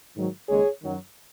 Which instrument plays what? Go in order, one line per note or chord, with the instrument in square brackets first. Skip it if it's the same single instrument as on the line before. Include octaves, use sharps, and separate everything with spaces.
[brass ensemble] G#2 D#3 F#3
D#2 C#3 G#3 G#4 C#5
F#2 D#3 F#3